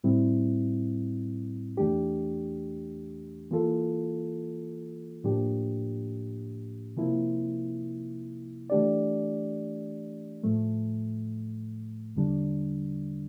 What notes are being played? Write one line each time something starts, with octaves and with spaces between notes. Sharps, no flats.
A2 G3 C4 E4
E2 E3 A3 D4 G4
E3 A#3 F4 A4
A2 F3 A#3 D4 G4
C3 F3 A#3 E4
E3 A3 D4 G4 D5
A2 F3 A3
E2 D3 G3 D4